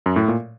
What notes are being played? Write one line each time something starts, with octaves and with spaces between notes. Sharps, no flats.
F#2
A2
A#2